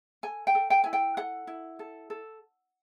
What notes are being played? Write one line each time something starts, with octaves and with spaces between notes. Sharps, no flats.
A4 G#5
G5
A4
G5
E4 G#5
G5
A4 F#5
E4
A4
A4